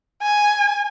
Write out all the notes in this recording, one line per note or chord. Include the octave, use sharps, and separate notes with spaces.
G#5